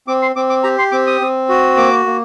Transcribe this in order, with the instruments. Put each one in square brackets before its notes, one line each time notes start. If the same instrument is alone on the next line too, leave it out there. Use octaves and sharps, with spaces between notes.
[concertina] C4 D6
C6
C4 D6
D6
G4 A#5
C6
C4 D6
D#6
C4
F#4
A#3 D6
A#3